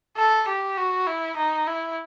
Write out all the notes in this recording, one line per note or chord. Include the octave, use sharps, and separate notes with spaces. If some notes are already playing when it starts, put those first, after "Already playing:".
A4
G4
F#4
E4
D#4
E4